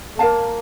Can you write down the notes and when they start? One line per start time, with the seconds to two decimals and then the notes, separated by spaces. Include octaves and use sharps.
0.15 A3
0.19 A#3 A#4 C#5 F5 A5